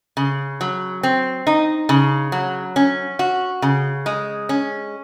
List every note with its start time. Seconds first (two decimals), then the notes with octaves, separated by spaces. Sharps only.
0.17 C#3
0.61 F#3
1.03 C4
1.47 D#4
1.89 C#3
2.32 F#3
2.76 C#4
3.19 F#4
3.62 C#3
4.06 G#3
4.49 C#4